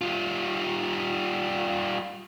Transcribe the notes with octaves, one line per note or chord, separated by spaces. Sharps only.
G3 F4